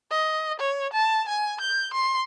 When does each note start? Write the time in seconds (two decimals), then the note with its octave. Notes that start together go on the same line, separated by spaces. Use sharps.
0.11 D#5
0.60 C#5
0.93 A5
1.28 G#5
1.61 G6
1.93 C6